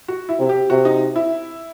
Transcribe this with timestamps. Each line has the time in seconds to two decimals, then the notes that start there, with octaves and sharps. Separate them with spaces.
0.08 F#4
0.29 E4
0.39 C3
0.49 G4
0.70 C3 F#4
0.85 D#4
1.16 E4